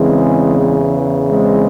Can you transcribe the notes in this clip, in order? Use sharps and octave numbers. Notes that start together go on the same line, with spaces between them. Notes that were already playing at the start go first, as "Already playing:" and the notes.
Already playing: E2 C#3 E3 G#3 C4
G#3 C4